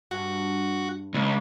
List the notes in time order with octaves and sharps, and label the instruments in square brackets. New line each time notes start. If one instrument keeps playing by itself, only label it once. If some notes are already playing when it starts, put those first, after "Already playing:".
[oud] G2 [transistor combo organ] F#4
[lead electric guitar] C#2